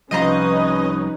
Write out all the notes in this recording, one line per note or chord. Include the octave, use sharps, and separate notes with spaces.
C2 F3 C#4 D#4 B4 D#5 A#5